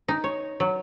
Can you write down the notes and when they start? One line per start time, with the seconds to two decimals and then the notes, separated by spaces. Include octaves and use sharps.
0.08 D#4
0.24 C#5
0.60 F#3